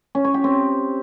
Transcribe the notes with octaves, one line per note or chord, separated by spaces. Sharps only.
C#4
C#5
G4
C4